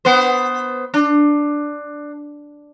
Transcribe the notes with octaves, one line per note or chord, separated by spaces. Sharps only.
B3 C5
D4